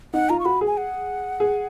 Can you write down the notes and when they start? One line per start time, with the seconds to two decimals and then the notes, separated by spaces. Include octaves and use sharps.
0.13 D#4 F#5
0.29 F4 A#5
0.40 C#6
0.45 F#4 B5
0.61 G#4
0.67 G#5
0.77 F#5
1.40 G#4